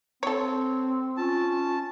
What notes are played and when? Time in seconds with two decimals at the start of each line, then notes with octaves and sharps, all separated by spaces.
0.23 C4 A4 C#5
1.17 C#4 F4 A5